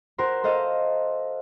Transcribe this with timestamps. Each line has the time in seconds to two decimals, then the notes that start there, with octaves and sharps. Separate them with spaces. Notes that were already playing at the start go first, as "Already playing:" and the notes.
0.18 F#4 A#4 C5 C6
0.44 A4 C5 D#5 F5